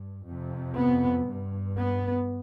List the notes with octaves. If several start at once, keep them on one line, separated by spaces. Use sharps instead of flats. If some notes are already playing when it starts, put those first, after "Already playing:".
Already playing: G2
F2 C3
B3
G2
B3